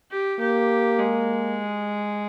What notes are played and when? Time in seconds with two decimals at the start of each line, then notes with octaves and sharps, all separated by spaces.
0.11 G4
0.40 A#3 G4
0.99 G#3